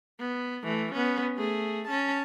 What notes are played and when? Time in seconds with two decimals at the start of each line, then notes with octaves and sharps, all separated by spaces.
0.19 B3
0.63 E3 A3
0.93 B3 C#4
1.36 A3 G#4
1.87 C#4 A5